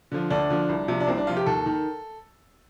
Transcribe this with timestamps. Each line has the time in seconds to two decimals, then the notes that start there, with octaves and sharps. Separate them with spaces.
0.12 D3 F3
0.30 D2 D4
0.50 D3 F3
0.69 C2
0.88 C3 F3
1.00 D4
1.07 C2 C4
1.18 D4
1.27 C3 F3 F4
1.37 G4
1.46 D#2 A4
1.66 D#3